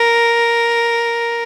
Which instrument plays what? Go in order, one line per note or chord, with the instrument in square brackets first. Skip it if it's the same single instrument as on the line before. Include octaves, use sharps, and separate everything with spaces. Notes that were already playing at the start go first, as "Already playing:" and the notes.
Already playing: [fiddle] A#4